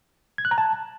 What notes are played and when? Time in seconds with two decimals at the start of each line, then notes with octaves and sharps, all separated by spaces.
0.38 G#6
0.45 F#6
0.51 A#5
0.58 A5